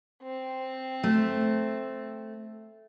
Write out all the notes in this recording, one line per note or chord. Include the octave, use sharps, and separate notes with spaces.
C4
A3